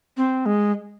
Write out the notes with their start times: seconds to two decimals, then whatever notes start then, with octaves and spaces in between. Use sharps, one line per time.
0.17 C4
0.46 G#3